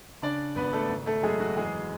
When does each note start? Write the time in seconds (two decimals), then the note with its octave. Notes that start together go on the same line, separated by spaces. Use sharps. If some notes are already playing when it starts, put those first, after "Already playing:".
0.22 C#3 D4 D5
0.56 G#1 B3 B4
0.73 A3 A4
0.90 G#1
1.06 A3 A4
1.23 F#2 G#3 G#4
1.40 F#3 F#4
1.57 E2 G#3 G#4